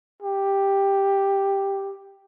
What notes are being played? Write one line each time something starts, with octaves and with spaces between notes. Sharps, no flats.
G4